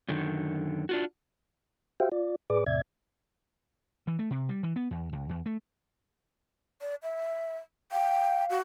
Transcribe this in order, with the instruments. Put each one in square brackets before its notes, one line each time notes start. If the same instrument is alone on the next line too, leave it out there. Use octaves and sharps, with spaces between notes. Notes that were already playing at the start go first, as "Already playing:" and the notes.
[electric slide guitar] F#2 D3 D#3
D4 F4 F#4
[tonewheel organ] F#4 G4 C5 E5 F5 G5
F4 D5
A2 G#4 B4 D5 D6
E2 A2 C3 D5 E5 G#6
[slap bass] E3
A3
C3
G3
E3
B3
E2
C#2
E2
A3
[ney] D5
E5
[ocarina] F5 [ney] G5
[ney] F#4